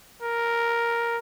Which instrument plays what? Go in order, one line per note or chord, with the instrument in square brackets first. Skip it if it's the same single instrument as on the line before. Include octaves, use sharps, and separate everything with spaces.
[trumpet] A#4